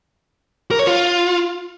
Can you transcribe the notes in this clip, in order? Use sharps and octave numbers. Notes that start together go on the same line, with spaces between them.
A#4
C#5
F4